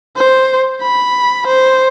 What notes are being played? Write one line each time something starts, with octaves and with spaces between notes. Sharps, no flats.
C5
B5
C5